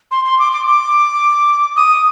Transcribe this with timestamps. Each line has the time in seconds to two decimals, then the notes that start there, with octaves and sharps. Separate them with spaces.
0.11 C6
0.25 C6
0.39 D6
0.53 D6
0.66 D6
1.76 D#6